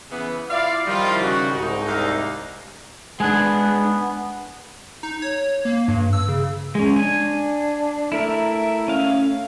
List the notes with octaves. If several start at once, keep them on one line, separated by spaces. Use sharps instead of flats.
C#3 E3 B3
E4 F4 D5 F5
D#3 F3 G3 E4 F4
C#3 F#4
C2 G#2 D#4
D#2 D4 F5
G#3 B3 D4 G#5 F#6 G#6
D#4
C#5
A#3
G2
E6
C#3
G#3 C#4
D4 G#5
A3 E4 A#4
C#4 F5